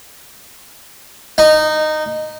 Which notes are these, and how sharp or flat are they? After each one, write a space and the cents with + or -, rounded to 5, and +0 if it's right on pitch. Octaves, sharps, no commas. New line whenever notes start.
D#4 -15